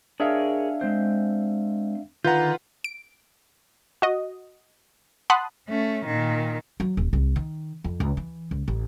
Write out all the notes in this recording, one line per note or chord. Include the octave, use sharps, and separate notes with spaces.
D4 G#4 A#4 C#5 E5 F5
G#3 C4 C5
D3 D#3 F4 B4 F#5 A#5 G6
D7
F#4 D#5
F#5 A5 B5 C6 D#6 F#6
A3 C#4
A#2 D#3
F#3
D#1
C2
D#3
F2
C#2
E3
C#2
A1